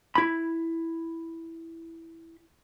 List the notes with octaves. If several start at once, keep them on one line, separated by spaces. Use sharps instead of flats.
E4 B5